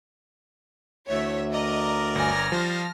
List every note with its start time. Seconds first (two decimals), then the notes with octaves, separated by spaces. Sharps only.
1.09 D2 E3 A3 C#5 E5
1.54 A#4 D5 D#5 A#5
2.15 G1 G#5 F6 A#6
2.52 F3 G3 F4 C5